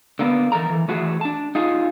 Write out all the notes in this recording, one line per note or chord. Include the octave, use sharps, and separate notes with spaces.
D3 A#3 B3
E3 A4 A#4 A#5
E3
E3 A3 F#4 G#4
D4 A5
D#4 F4 G#4